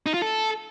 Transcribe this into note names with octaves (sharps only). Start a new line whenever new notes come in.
D#4
F4
A4